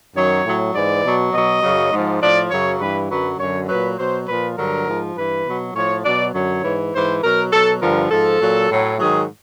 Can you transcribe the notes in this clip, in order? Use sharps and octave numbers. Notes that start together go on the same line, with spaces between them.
F#2 D#3 F#3 C#5
A2 F#3
G#2 E3 D5
B2 F#3
B2 F#3 D#5
F#2 C#3 F#3
G#2 F3
A2 F3 D5
F#2 C#3 F#3 C#5
G2 E3 B4
F#2 D3 F#3 B4
F#2 D3 F#3 C#5
A#2 F#3 B4
B2 F#3 C5
A#2 F3 B4
G2 D3 F#3 A#4
G#2 F3
G2 E3 B4
B2 F#3
A2 F3 C#5
B2 F#3 D5
F#2 D3 F#3 C#5
G#2 E3
G#2 E3 C5
B2 F#3 A#4
B2 F#3 A4
G2 D3 F3 A#4
G#2 F3 A4
A#2 F#3
A2 F#3
G#2 D#3 F#3 G#4